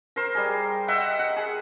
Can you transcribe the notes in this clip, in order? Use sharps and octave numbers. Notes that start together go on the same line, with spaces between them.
A#4 C5
G3 G#4
D#5 E5 F#5 G5
F#5
G#4